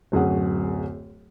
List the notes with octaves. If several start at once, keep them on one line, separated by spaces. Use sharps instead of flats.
D1 F#2 G#4 F#5